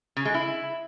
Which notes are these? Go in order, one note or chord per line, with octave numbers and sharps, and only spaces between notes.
C#3
G#3
E4